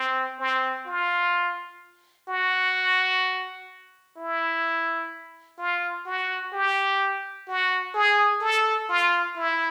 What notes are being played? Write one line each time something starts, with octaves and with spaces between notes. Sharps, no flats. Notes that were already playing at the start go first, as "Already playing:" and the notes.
Already playing: C4
C4
F4
F#4
E4
F4
F#4
G4
F#4
G#4
A4
F4
E4